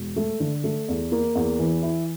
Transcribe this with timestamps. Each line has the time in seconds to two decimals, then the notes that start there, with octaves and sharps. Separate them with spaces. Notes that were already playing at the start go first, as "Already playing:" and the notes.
Already playing: E1
0.16 A3
0.40 D3
0.64 A3
0.88 E2
1.12 A#3
1.35 E2
1.59 E3
1.83 E4